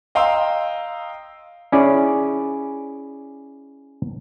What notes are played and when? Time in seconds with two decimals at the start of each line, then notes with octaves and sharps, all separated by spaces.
0.15 D#5 F5 G5 A#5 C6 E6
1.72 C#4 E4 G#4 D5